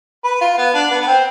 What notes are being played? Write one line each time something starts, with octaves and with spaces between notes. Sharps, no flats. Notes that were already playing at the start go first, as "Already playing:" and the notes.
B4
F4
B3
D4
B3
B3
C4